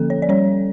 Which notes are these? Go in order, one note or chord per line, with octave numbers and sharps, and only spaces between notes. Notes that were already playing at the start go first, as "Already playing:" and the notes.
Already playing: D3 F3 A#3 C#4 A4
C#5
D5
G3 C#4 C#5